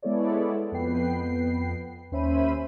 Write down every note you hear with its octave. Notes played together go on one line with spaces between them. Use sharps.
G#3 B3 E4 A4 C#5 D5
F2 B3 B4 G5 C7
D#2 C#4 C5 E5 B5 D#7